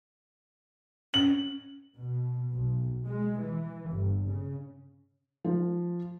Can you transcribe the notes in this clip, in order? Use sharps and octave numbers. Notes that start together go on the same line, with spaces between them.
C#4 F#7
B2
B1
G#3
E3
G1
C#3
F3